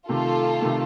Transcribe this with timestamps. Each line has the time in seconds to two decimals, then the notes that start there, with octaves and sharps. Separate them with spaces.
0.09 C3 D#3 A3 F4 A4
0.61 C3 D#3 A3